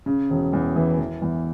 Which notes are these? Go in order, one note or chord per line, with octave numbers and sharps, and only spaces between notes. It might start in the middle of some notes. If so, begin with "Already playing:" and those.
C#3
E1
E2
E3
E3
E2